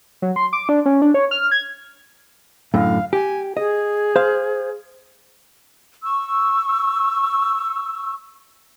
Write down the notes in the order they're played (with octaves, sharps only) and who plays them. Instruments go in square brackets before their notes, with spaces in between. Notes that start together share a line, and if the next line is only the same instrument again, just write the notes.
[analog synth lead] F#3
C6
D6
D4
C#4
D4
C#5
F6
G#6
[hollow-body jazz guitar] F#2 A2 D3 [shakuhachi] F5
[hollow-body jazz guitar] G4 [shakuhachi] G#5
[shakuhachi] G#4 [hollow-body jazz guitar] D#5
[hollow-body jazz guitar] C5 F5
[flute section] C#6 E6